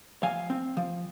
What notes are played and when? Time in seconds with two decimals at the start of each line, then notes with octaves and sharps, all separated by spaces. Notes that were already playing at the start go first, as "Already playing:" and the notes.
0.23 F3 F5 G#5
0.50 C4
0.77 F3